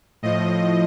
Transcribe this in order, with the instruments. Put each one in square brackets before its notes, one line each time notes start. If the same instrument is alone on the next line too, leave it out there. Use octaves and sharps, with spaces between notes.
[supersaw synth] A2 F3 D#5